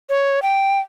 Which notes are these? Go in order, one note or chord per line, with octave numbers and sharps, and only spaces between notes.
C#5
G5